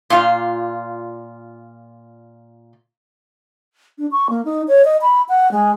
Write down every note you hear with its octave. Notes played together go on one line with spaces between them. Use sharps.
A#2 F4
D4
C#6
A#3
D#4
C#5
D#5
B5
F#5
G#3